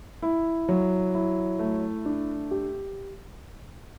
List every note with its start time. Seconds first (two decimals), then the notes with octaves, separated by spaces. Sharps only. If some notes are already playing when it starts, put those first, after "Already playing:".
0.22 E4
0.69 F#3
1.14 E4
1.59 A3
2.06 D4
2.51 G4